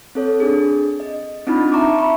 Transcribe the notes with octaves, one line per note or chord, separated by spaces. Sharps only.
C4 A4 C#5
D4 G#4
D#5
C4 D4 D#4 F4 B5
E5 A5 A#5 C#6 D6
E5 B5 C#6